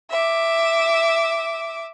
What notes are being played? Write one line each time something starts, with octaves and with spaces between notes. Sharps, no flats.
E5 D6